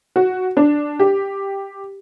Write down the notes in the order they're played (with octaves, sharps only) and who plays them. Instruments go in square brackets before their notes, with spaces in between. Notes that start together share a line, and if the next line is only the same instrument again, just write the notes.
[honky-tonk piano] F#4
D4
G4